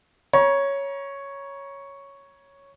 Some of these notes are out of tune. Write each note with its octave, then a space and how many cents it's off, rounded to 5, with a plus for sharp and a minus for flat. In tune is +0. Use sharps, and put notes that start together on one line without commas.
C#5 +0 A#5 +35